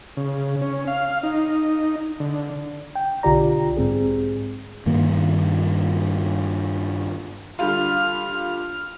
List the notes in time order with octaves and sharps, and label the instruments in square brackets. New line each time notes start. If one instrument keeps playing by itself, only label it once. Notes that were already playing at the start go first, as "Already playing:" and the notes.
[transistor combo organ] C#3
C#4
F5
D#4
D3
[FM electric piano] G5
B1 D3 F4 G4 D5 A#5
G#2 C4 G#4
[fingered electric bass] G2 D#3 A#3
[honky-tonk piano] D3 G3 F4 [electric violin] F6